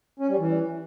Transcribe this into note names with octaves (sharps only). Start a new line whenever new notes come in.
C#4
G3
E3